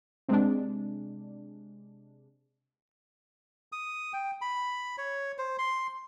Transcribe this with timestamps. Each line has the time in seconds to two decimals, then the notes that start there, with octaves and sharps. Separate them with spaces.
0.29 C3 G#3 D4
3.72 D#6
4.13 G5
4.41 B5
4.98 C#5
5.38 C5
5.59 C6